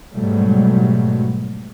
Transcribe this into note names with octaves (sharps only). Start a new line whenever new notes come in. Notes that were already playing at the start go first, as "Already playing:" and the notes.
G#2 B2 F#3 G3 A3